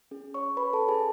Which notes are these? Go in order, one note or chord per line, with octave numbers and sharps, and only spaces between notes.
C#4 G#4
C#5 C#6
B4 B5
A4 A5
G#4 G#5